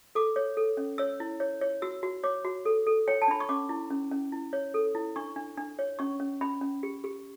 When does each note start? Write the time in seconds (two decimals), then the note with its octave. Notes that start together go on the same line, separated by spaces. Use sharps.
0.15 A4 D6
0.36 C#5
0.57 A4
0.77 C#4
0.98 C#5 E6
1.20 E4
1.40 C#5
1.61 C#5
1.82 F#4 E6
2.03 F#4
2.24 C#5 D6
2.45 F#4
2.65 A4
2.87 A4
3.08 C#5 G5
3.22 A5
3.28 D4 B5
3.40 C#6
3.49 C#4 D6
3.69 E4
3.90 C#4
4.11 C#4
4.32 E4
4.53 C#5
4.74 A4
4.95 E4
5.16 D4 C#6
5.36 D4
5.57 D4
5.79 C#5
5.99 C#4 C#6
6.20 C#4
6.41 C#4 B5
6.61 C#4
6.83 G4
7.04 G4